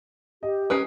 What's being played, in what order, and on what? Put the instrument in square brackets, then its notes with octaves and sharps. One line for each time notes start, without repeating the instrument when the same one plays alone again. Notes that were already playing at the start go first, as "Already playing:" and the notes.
[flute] G4 [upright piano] D#5
[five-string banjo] C#4 A#4 B4 [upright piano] D#6 C7